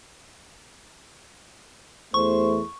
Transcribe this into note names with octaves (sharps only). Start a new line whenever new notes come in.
E2 A3 C5 C#6